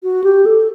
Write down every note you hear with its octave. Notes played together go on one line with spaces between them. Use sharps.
F#4
G4
A4